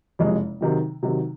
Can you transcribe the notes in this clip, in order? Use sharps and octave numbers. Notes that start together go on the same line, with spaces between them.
F#1 F2 C3 F3 G#3
C3 D#3 F#3
C3 D#3 F#3